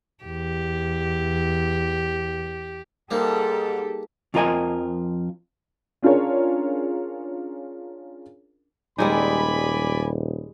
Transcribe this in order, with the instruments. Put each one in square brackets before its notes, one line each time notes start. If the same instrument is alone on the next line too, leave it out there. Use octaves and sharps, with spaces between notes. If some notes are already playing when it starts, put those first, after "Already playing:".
[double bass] E2 [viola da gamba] G4
[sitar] G#2 [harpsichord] G3 A#3 [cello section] G4 A4
[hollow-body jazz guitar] F2 F3 F4 A#4 D#5 G#5
[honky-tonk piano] C#4 D4 F4 G#4 A#4 C#5
[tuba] D#1 [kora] G3 G#3 D#4 [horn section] D5 G#5 B5